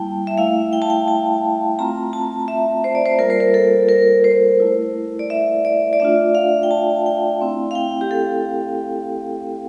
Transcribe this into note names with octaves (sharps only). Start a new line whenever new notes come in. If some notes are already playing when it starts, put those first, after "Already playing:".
Already playing: G3 A#3 E4 G5 A5
E5
A3 E4 F5
G5
A5
G5
A5
A3 C4 F4 A#5
A5
E5
C5
D5
C5
G3 A#3 F4 A#4
C5
A#4
A4
A#4
C5
A3 E4
D5
E5
D5
D5
A3 D4 F4 E5
F5
G5
A5
G5
A3 C4 E4
F5
G5
G4
A4